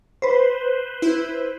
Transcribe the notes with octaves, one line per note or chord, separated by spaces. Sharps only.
B4 C5
E4